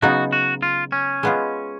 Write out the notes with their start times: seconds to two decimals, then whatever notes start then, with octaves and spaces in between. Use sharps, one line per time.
0.02 C#3 F#3 B3 D#4 F#4
0.33 F#4
0.63 F4
0.92 C#4
1.23 G#3 B3 F4